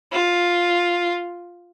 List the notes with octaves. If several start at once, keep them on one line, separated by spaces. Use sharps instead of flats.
F4